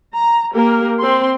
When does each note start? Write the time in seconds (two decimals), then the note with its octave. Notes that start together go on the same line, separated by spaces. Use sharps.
0.15 A#5
0.54 A#3 G4 A#4
1.00 C4 C6